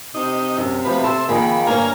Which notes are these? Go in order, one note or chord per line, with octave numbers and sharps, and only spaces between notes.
C3 D#4
F#2
B2 F3 A3 B4
A4 C5 E5
F2 D#3 A#3 G#4 B5
D2 G2 A#3 C#5 F5 G#5 A#5